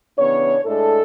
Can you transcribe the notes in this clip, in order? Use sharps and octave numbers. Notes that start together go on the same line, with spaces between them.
C#3 E3 B3 D4 C#5
A2 G#3 D4 A4